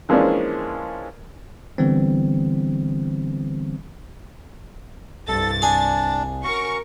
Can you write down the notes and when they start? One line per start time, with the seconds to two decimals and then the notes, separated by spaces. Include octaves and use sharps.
0.09 E3 F3 G#3 A#3 C#4 D4
1.78 D3 E3 G3 B3 C4
5.28 C2 G2 A4 A6
5.62 D4 G#4
6.44 C#4 F#4 A#4 C#6